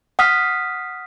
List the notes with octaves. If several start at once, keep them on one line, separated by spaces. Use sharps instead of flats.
F#5 D#6 F6 B6